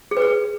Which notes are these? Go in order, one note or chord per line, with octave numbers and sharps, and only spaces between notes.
G#4
B4
G#4